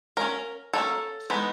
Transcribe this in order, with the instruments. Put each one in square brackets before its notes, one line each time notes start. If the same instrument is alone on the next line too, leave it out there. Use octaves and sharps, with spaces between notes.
[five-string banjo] F#3 A#3 C#4 A#4
F#3 A#3 C#4 A4
E3 G#3 B3 D#4